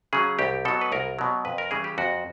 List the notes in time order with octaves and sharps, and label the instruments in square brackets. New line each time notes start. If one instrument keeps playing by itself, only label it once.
[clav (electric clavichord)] C#3 F#3 G#4
C2 G4
B2 F#3 A4
B4
C2 A#4
B2 F#3
F2 B4
A#4
C#3 E3 G3 G#4
G4
F2 F#4